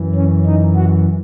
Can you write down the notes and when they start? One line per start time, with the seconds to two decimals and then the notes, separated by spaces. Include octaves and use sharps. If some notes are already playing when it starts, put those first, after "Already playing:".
Already playing: F#2 E3
0.15 C#4
0.46 D#4
0.75 F#4